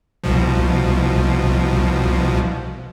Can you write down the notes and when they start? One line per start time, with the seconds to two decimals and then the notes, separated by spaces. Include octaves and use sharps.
0.24 C2 B2 F3